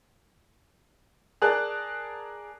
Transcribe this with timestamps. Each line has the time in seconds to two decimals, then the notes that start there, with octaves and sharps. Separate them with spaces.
1.42 G#4 A#4 D5 A5 F#6